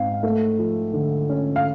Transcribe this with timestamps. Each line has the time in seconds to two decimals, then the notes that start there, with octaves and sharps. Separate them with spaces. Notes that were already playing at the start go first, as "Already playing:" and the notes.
Already playing: G#2 C4 F5
0.23 A3
0.59 F3
0.93 D3
1.29 C#4
1.56 F5